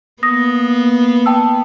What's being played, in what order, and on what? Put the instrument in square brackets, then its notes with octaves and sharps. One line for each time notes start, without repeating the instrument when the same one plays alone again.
[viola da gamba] A#3 B3 [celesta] D#6 A#6
[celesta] G5 A5 E6